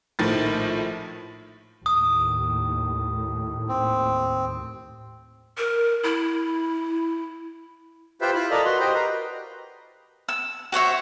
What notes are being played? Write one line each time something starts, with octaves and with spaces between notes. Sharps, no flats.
A#1 A2 D#3 F3 A6
D#2 A2 D#6
C4
A#4
E4
F4 G4 B4 C5 E5
E4 F4 B5
A4 A#4 D5 D#5 F5 B5
F#4 B4 C6
G4 C5 D#5
A#4 B4
E6
F#4 C5 C#5 E5